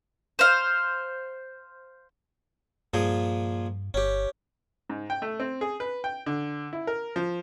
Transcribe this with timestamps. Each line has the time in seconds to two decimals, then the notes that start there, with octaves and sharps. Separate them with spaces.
0.39 C5 F5
2.94 G2 A#2 F3 G#4
3.94 G1 C#4 G4
4.90 G#2
5.10 G5
5.22 A3
5.40 C4
5.61 G#4
5.80 B4
6.04 G5
6.26 D3
6.73 E4
6.87 A#4
7.16 F3